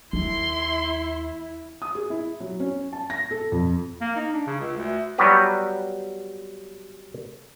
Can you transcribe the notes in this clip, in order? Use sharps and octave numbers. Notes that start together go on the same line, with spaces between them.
D#2 E4 C6
D#6
G#4
E4
F#3
C#4
A5
A#6
A4
F2
A#3
D#4
D4
C#3
C#2
D2
F#3 G3 B3 F#4 G4 B4